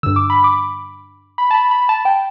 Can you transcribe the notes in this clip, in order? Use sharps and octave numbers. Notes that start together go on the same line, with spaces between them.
G2 D3 E6
D6
B5
D6
B5
A5
B5
B5
A5
G5